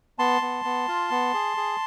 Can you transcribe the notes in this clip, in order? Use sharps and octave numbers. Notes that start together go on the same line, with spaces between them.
B3 A5 C6
B3
B3
F4
B3
G#4
G#4